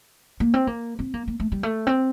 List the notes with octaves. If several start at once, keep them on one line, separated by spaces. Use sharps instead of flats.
A#3
C4
A#3
C4
A#3
A#3
A3
G3
A3
C4